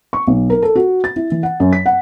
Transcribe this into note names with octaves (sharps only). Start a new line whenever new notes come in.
C#6
B1
A#4
A4
F#4
A6
E4
E3
F#5
F#2
B6
F#5